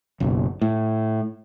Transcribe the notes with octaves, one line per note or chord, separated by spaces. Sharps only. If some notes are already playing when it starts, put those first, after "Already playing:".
F#1 B1
A2